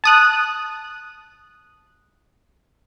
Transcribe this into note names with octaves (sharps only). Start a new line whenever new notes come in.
A5 D#6 F#6